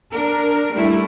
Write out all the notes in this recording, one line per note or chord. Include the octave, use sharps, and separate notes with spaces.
D4 A#4
G3 A3 E4